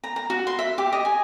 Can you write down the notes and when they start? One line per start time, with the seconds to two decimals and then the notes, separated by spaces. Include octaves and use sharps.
0.04 A#5
0.16 A#5
0.30 F#4
0.47 C6
0.59 E5
0.78 G4
0.92 D#5
1.05 G#5